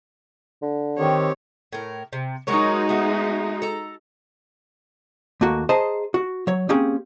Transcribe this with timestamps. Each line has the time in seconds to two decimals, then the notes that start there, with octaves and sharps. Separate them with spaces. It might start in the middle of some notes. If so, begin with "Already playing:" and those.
0.62 D3
0.98 D#3 C4 G4 C#5
1.73 A2 A#4
2.13 C3
2.47 F#3 G#3 D#4 F#4 A#4 C#5
2.89 A3 B3
3.62 A4 A#5
5.41 D#2 A3 A#3 F#4
5.69 G#4 C5 D#5 A5 A#5
6.14 F#4
6.47 F#3 C#5
6.69 A#3 C4 C#4 G4 G#4